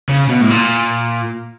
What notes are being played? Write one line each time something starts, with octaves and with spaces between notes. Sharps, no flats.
C#3
B2
A2
A#2